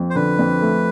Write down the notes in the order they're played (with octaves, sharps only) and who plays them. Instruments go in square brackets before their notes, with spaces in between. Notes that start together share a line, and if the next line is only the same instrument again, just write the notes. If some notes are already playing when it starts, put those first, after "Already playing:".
Already playing: [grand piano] F2
[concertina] C5
[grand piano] D3 [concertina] B4
[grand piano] F2
A3